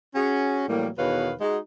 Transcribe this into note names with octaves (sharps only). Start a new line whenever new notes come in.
C#4 F#4 G#4
A2 E3 F#3 G3 A#3
E2 B2 D#3 B4 C#5 F5
G#3 D#4 F#4